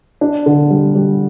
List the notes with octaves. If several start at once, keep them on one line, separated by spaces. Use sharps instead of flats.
D4
D3
G3
G3